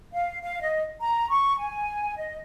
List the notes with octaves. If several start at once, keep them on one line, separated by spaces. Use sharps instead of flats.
F5
F5
D#5
A#5
C#6
G#5
D#5